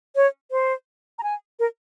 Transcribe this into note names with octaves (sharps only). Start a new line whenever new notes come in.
C#5
C5
A#5
G#5
A#4